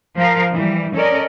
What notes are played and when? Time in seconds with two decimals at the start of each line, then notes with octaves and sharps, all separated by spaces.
0.17 F3 A#4 F5
0.54 E3 G3
0.95 C#4 A4 A#4 D5 D#5